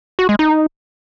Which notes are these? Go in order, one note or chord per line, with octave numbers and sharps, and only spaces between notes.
F#4
G#3
D#4